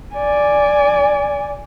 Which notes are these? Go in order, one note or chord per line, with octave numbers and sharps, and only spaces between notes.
D5 G#5